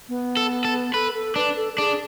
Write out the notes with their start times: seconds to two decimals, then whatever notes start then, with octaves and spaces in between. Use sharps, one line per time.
0.09 B3
0.37 A4
0.65 A4
0.94 A4 B4
1.14 A4
1.36 D4 B4
1.56 A4
1.73 A4
1.78 D4 G#4